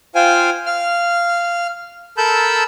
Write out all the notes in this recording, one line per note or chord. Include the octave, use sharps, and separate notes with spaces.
F4 C5 F5 G5 G#5
F5 F6
A4 A#4 A5 B5 E6 G6